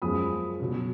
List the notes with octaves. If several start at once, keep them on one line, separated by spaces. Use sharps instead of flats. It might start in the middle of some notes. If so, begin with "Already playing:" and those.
F#2 F3 G#3 B5 D#6
B2 F#3